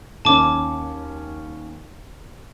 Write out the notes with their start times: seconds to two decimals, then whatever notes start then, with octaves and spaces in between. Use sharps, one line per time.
0.25 D#2 C#4 A5 D6